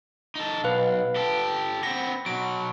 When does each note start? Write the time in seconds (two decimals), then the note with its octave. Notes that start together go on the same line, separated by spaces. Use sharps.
0.35 D#4 A4
0.64 B1 B4 F5
1.16 G4 A4
1.83 B3 C4 A#6
2.26 B2 F#3 D7